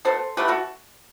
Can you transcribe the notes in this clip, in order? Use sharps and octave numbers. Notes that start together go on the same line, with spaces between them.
B2 A3 A4 C5
B2 A3 G4 B4
F#4 A4